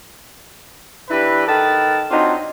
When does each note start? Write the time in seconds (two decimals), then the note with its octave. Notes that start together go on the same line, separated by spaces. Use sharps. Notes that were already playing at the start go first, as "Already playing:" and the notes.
1.10 E3 D4 E4 G4 B4
1.47 D#3 A4 B4 A5
2.11 F#3 C4 D4 D#4 F4